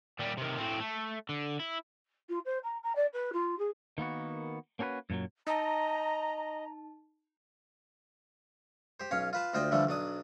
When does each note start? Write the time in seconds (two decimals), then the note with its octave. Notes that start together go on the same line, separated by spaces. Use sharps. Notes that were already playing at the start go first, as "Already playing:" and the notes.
0.19 A#2 G3
0.38 C3 D#3
0.58 A2 C4
0.80 A3
1.29 D3
1.59 E4
2.29 F4
2.45 C5
2.63 A#5
2.83 A#5
2.95 D5
3.13 B4
3.33 F4
3.58 G#4
3.98 D#3 A#3 B3 F#4
4.79 A#3 C#4 F#4 A4 B4
5.10 F#2 A#2 E3 F#3
5.47 D#4 D#5 A5 A#5
9.00 G4 C5
9.11 B1 C#4 C#5 F5
9.33 F4 B4 A5
9.54 D2 F4 C5 D5 D#5 G5
9.71 D3 E3 F3 G3 A3 D4
9.87 B1 F#3 D4 D#6